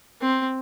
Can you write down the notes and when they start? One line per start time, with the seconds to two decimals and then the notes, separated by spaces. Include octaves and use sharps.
0.21 C4